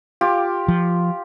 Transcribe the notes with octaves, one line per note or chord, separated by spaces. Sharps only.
F4 G4 D6
F3